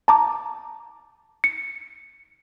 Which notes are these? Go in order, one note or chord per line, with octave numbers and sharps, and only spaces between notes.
A5 A#5 D6
C#7